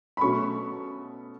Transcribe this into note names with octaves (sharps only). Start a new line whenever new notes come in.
B5
B2 F#3 A3 C#4 C#6